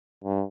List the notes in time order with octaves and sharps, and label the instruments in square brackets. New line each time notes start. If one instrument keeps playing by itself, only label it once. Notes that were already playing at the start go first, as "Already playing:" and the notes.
[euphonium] G2